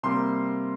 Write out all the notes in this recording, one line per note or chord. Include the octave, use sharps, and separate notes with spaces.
C3 G3 A#3 C6